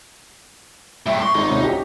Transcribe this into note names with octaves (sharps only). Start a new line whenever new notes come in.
A2 G3 E5
C6 C#6
G#1 D#4 D#5
D#1 C2 C#4
F#4 G4